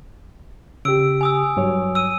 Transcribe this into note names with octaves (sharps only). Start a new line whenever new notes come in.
C#3 G4 E6 D7
G#5 D#6 E6
G2 F#3 C#5
E6 D#7